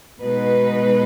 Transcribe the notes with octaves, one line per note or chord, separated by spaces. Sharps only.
B2 G#3 D#4 B4